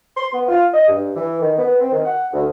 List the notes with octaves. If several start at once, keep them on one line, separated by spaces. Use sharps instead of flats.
C6
B3
F4
D#5
G2
E3
D#3
B3
C4
D#3
F#5
D2